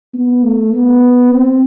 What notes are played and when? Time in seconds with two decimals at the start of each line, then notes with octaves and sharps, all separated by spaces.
0.14 B3
0.43 A3
0.72 B3
1.31 C4